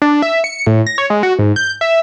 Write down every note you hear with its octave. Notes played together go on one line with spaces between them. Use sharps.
D4
E5
C#7
A2
A#6
C#5
G#3
F#4
G#2
G6
E5